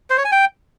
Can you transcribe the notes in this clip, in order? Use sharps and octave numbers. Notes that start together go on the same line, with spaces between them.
C5
C#5
G#5
G5